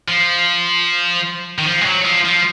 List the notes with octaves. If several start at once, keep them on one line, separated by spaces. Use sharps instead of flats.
F3
D#3
F3
G#3
F#3
F3
F3